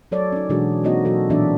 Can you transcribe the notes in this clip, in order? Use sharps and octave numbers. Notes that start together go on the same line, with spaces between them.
F#3 A4 C#5 D5
C#4 D#4
B2 E3 G#3 D4 F#4 G#4
A#3 C4 D#4 F#4 C#5 D#5
B2 F#3 F#4 A4
A#2 E3 B3 D4 D5 E5